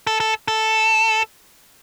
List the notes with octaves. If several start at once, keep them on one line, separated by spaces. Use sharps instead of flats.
A4
A4
A4